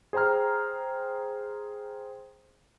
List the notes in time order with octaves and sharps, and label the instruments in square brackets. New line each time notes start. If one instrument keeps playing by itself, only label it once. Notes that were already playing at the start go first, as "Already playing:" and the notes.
[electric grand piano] G#4 C5 G5 A#5 F6